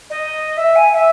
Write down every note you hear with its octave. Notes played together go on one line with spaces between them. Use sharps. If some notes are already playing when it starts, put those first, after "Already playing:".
D#5
E5
G#5
E5